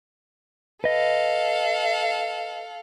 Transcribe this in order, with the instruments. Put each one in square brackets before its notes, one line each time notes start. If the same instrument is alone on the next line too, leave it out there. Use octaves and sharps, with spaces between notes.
[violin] A4 F5 [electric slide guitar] B4 D#5